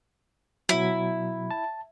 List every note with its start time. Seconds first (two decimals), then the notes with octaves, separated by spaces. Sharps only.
0.69 B2 F#3 E4
1.51 A5